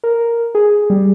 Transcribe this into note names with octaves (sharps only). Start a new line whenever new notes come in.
A#4
G#4
G3